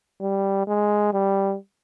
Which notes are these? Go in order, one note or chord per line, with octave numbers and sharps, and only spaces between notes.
G3
G#3
G3